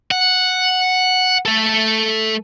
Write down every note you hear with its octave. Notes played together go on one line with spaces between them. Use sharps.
F#5
A3 A4